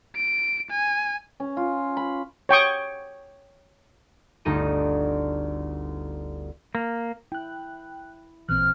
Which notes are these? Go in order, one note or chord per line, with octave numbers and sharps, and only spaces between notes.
D7
G#5
C#4
F4
B5
C#5 G5 C#6 D#6
G1 D2 D#4 A4 D#7
A#3
E4 G5 F#6
A1 A#2 E3 C4 F6 F#6